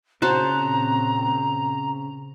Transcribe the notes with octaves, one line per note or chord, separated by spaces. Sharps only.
A#2 C#3 C4 F#4 C5 A5 A#5 F#6